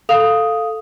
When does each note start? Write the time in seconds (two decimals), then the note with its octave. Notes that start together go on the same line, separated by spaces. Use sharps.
0.09 A4 F5 D#6 F7